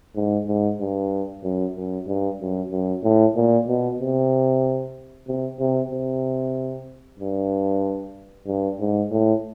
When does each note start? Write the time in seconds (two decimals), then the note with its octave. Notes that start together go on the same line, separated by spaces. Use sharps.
0.15 G#2
0.47 G#2
0.80 G2
1.43 F#2
1.76 F#2
2.07 G2
2.39 F#2
2.71 F#2
3.03 A2
3.36 A#2
3.67 B2
3.99 C3
5.27 C3
5.60 C3
5.91 C3
7.19 G2
8.47 G2
8.79 G#2
9.11 A2